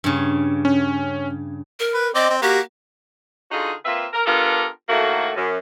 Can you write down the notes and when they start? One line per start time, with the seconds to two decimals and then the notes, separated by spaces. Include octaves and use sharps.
0.04 G2 C#3
0.65 C#4
1.80 A#4
1.94 B4
2.15 C4 D5 D#5
2.30 C4
2.42 A#3 F#4 G4
3.51 D3 D#4 F4 F#4 G#4
3.85 A#3 C4 F4 B4 E5
4.13 A#4
4.26 B3 D4 F4 G4 A4 A#4
4.89 A2 D#3 A3 A#3 F#4
5.36 F#2